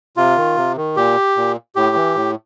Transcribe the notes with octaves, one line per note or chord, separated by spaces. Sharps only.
C3 F4
D#3
C3
D#3
A#2 G4
A#2
A2 G4
E3
A2